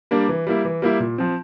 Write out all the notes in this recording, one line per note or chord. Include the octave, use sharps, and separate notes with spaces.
G3 A#3 D4
E3
G3 A#3 E4
E3
G3 A#3 E4
A#2
F3 C4